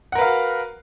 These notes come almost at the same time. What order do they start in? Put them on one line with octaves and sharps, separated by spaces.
F#5 A#4 B4 F5 F#4